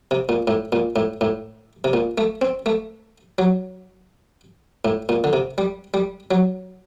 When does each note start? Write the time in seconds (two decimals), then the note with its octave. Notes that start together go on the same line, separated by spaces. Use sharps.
0.11 C3
0.29 A#2
0.47 A2
0.72 A#2
0.96 A2
1.21 A2
1.84 C3
1.93 A#2
2.18 A3
2.42 C4
2.66 A3
3.38 F#3
4.85 A2
5.09 A#2
5.24 D3
5.33 C3
5.58 G3
5.94 G3
6.31 F#3